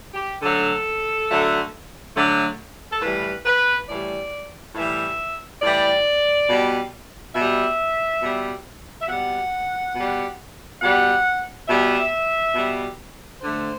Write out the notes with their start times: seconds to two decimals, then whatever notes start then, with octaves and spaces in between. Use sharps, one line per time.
0.14 G4
0.42 D3 F#3 A3 A4
1.28 D3 F#3 A3
2.16 D3 F#3 A3
2.91 A4
3.02 A2 E3 G3 B4
3.45 B4
3.89 A2 E3 G3 D5
4.75 A2 E3 G3 E5
5.62 A2 E3 G3 D5
6.49 B2 G3
7.35 B2 G3 E5
8.21 B2 G3
9.01 E5
9.08 B2 G3 F#5
9.95 B2 G3
10.82 B2 G3 F#5
11.68 B2 G3 E5
12.55 B2 G3
13.41 D3 A3 C5